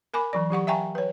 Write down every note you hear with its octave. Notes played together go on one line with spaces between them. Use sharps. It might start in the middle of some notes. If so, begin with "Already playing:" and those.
A#4 G#5 B5 D6
E3 F#3 D5
F#3 G4 F#5 C#6
E5 F5 G5 G#5 A#5 C#6
B4 C#5